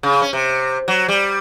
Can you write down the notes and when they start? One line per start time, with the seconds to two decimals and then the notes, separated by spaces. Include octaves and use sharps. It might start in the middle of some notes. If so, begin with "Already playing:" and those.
0.03 C#3
0.22 C#4
0.33 C3
0.88 F#3
1.08 G3